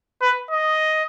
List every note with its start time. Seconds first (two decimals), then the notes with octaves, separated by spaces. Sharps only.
0.22 B4
0.51 D#5